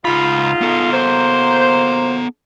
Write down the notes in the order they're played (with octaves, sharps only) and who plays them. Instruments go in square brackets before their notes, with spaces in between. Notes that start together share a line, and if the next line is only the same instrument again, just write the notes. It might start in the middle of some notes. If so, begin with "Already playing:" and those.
[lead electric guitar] C#2 B5 [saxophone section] G#2 D#4 F4
[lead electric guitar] B3 A4
[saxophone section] F#3 A#3 C5